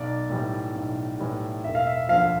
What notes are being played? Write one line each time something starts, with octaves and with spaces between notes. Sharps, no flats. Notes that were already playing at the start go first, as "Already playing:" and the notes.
Already playing: B1 D5
A2 E3 G3
B1
A2 E3 G3
E1 E5
F5
E5
D2 D3 F3 F5